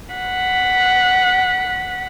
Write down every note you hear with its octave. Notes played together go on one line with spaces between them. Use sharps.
F#5 B6